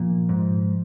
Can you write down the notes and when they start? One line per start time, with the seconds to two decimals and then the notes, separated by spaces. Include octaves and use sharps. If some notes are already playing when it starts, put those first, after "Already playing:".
Already playing: A#2 F3
0.29 G#2